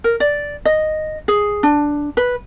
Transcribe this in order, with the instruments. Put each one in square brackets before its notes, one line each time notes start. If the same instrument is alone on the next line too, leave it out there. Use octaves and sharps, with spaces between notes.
[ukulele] A#4
D5
D#5
G#4
D4
B4